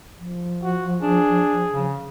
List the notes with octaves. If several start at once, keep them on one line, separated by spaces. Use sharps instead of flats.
F3
F#4
D4 G#4
C#3